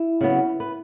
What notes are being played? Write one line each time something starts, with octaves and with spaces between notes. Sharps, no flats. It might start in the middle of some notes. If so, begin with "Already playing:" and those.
Already playing: E4
C#3 F#3 B3
B4